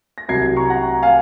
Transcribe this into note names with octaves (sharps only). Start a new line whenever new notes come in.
A#6
C2 C3 F#3 G#6 C7
A#5 C#6
F#5 A#5
F5 G#5